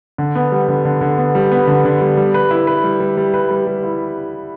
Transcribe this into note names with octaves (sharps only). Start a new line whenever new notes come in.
D3
B3
G3
D3
D3
D3
B3
G3
B3
D3
D3
G3
G3
B4
E4
B4
G3
G3
G3
B4
G3
G3
E4